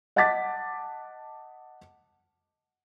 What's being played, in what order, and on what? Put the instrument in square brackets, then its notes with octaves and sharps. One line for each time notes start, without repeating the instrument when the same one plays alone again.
[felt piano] D#5 F#5 A5 D6 A6 B6